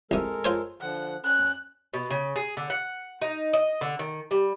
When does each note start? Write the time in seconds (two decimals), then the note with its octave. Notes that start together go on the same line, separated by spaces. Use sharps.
0.11 C2 C3 G#3 A4 A#4
0.45 F4 C5 C#5
0.81 D3 F3 F#5
1.24 C#4 F#6
1.93 B2
2.10 C#3
2.36 G#4
2.57 D3
2.70 F#5
3.22 D#4
3.53 D#5
3.81 D3
3.99 D#3
4.31 G3